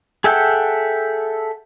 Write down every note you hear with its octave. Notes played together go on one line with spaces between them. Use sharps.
G#4 A4 E5 F#5 G5